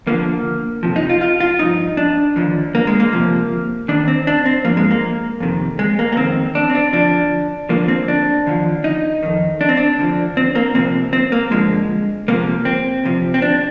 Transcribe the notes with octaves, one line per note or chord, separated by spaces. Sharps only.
D2 D3 F3 A#3
F2 C3 F3
D#4
F4
F4
F4
G2 F3 D#4
D4
D#2 D3 F3
A#3
G#3
A#3
D2 C3 F3
D#2 D#3 D4
C4
D4
C4
G2 F3 A#3
G#3
A#3
F2 C3 D#3
G#3
A#3
A#3
F2 D#3 C4
D4
C4
D4
D2 D3 F3 D4
D2 D3 F3 A#3
C4
D4
D#2 D3 F3
D#4
F2 D#3
D4
C4
D4
D2 D3 F3
C4
A#3
D2 C3 F3 C4
C4
A#3
G2 D3 F3 G#3
D2 C3 F3 A#3
C4
D2 C3 F3
C4
D4